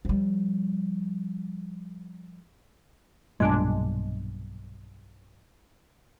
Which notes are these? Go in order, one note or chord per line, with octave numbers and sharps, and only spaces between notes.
F3 G3
B1 G2 A#2 G#3 D4